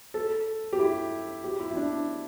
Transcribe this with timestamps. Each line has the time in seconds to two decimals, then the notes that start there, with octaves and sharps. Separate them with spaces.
0.14 A4
0.73 G4
0.80 E4
1.44 G4
1.60 E4
1.71 E4
1.77 D4